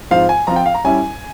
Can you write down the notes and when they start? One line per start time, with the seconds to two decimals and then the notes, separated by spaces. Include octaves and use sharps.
0.11 G#2 F3 C4 F4 C5 F5
0.29 G#5
0.47 F3 C4 F4 A#5
0.56 G5
0.66 F5
0.74 A#5
0.84 G3 C#4 E4 G#5